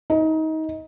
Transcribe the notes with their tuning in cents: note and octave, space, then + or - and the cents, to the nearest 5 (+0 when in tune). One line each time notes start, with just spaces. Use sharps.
D#4 +25